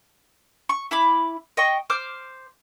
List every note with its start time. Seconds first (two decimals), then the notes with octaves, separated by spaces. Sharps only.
0.69 C#6
0.91 E4 B5 D6
1.57 D#5 G5 C#6
1.90 C5 D6 F6